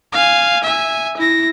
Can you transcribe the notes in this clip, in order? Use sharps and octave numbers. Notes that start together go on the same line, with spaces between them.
F5 G#5
E5 G#5
E4 A#6